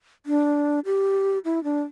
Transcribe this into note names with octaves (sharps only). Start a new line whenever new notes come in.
D4
G4
E4
D4